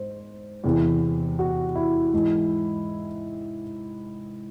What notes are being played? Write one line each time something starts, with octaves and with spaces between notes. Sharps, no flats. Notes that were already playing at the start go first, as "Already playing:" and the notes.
Already playing: G#2 C5
E2 C3 E3
F#4
E4
G#2 E3